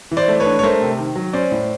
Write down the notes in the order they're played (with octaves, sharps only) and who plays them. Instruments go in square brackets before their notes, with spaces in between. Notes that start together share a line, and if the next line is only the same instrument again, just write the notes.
[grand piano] E3
C5 D5
A3
B4 C#5
D4
C#5
A3 A#4 C5
C3
D#3
F#3
C#4 C5 D5
A2